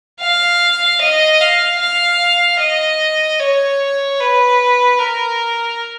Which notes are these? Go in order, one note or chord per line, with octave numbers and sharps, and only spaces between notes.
F5
D#5
F5
F5
D#5
C#5
B4
A#4